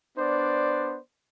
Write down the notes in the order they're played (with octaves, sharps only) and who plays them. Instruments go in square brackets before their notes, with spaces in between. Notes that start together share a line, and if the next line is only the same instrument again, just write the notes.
[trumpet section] B3 D4 C5 D5